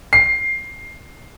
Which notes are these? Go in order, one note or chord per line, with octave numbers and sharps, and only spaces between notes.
C7